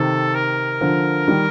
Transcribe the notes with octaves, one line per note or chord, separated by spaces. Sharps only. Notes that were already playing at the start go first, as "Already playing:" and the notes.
Already playing: C3 D#3 A4
A#4
D3 F3
D#3 G3